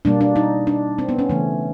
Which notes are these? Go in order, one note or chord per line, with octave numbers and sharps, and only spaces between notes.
B2 G3 A#3 D4
D4
D#4
D4
C4
B3
C#4
C#3 E3 A3